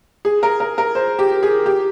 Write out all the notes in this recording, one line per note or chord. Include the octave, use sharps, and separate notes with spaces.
G#4
A#4
A#4
A#4
C5
G4
G#4
G4